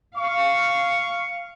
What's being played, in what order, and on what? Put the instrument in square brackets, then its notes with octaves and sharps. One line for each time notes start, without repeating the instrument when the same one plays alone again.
[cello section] F5 [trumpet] C#6